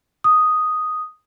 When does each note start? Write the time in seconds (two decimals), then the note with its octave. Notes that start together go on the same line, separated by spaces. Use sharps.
0.24 D#6